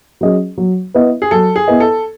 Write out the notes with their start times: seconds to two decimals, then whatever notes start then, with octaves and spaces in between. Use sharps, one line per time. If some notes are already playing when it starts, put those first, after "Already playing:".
0.21 F#3 C#4 G#4 D#5
0.58 F#3
0.94 B3 E4 B4 D#5
1.22 G#4
1.31 F#3 A4
1.56 G#4
1.68 B3 E4 B4 D#5
1.80 A4